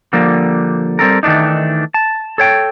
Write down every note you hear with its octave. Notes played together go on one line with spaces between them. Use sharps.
D3 F3 G3 A#3
G3 C4 A4 A#4
D#3 E3 A3 D4 D#4
A5
A4 C#5 G5